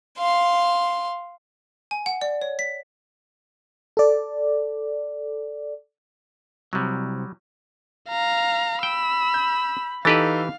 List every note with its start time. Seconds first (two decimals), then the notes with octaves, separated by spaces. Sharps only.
0.18 F5 C6
1.91 G#5
2.06 F#5
2.21 D5
2.42 C#5
2.59 B6
3.97 A4 D5
6.73 C2 C3 F#3 G3
8.09 F5 A#5
8.83 G5 B5 E6
9.34 G6
10.05 E3 D#4 G4 A4 B4 F5 A6